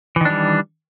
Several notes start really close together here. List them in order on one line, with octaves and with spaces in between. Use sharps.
E3 D#3 D4 G3